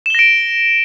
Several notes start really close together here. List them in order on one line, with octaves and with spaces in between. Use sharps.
E7 G7 A#6 D7